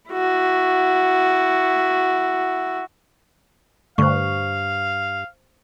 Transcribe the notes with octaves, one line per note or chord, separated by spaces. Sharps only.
E4 F#4
G2 D3 A3 C5 F5 C#6